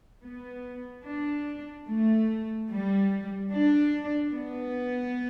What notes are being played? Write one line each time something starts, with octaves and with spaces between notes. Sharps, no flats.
B3
D4
A3
G3
D4
B3